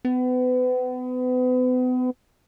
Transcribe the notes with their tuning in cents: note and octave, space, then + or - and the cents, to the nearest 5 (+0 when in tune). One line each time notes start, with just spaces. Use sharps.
B3 +35